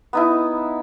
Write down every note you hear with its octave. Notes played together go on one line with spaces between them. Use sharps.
B3 D#4 E4